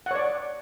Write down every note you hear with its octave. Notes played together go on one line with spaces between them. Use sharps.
C#5 D5 F#5